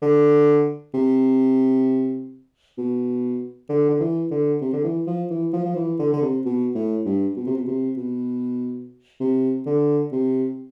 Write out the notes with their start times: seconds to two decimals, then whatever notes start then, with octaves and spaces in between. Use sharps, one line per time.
0.02 D3
0.94 C3
2.78 B2
3.69 D3
3.90 D3
4.00 E3
4.31 D3
4.61 C3
4.73 D3
4.84 E3
5.07 F3
5.30 E3
5.53 F3
5.65 F3
5.76 E3
5.99 D3
6.13 D3
6.22 C3
6.45 B2
6.75 A2
7.05 G2
7.37 B2
7.47 C3
7.57 B2
7.68 C3
7.97 B2
9.20 C3
9.66 D3
10.12 C3